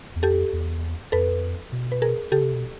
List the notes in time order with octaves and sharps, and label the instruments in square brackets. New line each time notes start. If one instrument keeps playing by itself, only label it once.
[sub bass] E2
[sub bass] F2 [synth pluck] G4 A4
[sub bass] E2
[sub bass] F2 [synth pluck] A4 B4
[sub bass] B2
[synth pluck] B4
G#4 A#4
[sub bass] C#3 [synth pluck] G4 A4
[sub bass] C3
B2